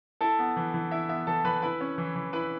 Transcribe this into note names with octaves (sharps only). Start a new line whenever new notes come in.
E4 A4 A5
B3
E3
E3
E4 E5
B3 E5
E3 A4 A5
E3 B4 B5
E4 B4 B5
C#4
E3
E3
E4 B4 B5